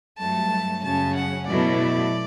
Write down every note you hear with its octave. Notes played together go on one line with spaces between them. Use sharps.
G2 F#3 A3 A5
F#2 C#3 F#3 C#4 A5
F#5
B2 F#3 A3 E4 D5